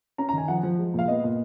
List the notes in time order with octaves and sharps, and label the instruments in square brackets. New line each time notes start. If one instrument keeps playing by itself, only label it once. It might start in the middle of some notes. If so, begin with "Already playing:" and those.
[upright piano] C#4 A#5
A#5
D#3
G#5
F3 F#5
F3
G#3
A#2 F5
B3 D#5
A#2